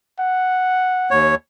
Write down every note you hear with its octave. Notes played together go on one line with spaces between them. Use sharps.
F#5
D#2 C#5